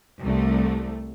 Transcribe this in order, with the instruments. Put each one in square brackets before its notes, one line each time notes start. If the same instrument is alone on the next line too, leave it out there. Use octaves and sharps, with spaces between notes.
[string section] C2 A3